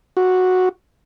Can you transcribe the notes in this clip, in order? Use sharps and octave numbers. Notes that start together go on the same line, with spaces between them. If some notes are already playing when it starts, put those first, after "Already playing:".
F#4